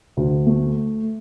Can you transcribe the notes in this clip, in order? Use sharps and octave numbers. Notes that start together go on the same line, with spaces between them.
D2
A3